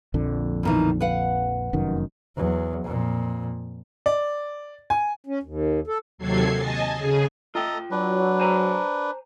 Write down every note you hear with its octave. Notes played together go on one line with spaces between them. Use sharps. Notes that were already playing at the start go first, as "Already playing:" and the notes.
A#1 F2 D3
B2 D#3 E3
B4 F5 F#5
F1 F#2 D#3
E2 F#3
F2 A#2
D5
G#5
C#4
D#2
A4
D#2 C3 F#3 A4 G#6 C7
D#5 G#5 A5
C#3 G#4
A3 F4 A4 D#5 G5 A#5
F#3 D4 B4
C5 G#5 A#5